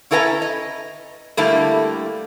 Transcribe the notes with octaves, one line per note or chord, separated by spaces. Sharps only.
C#4 E4 A4 B4 F5 A#5
D#5
D3 G3 A3 A#3 E4 A4